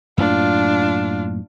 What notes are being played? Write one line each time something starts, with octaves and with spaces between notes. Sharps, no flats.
F#2 A2 A#3 D4 F4